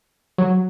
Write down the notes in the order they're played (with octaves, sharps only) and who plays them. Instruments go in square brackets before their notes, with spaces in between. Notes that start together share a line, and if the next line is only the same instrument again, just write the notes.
[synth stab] F#3